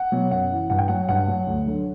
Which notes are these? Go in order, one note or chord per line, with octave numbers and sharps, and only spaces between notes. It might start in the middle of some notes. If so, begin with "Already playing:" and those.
Already playing: F#5
B2 F#3
F#2 F#5
E3
G2 F#5
G5
F#3 F#5
G2 F#5
F#3
D2
D3 F#3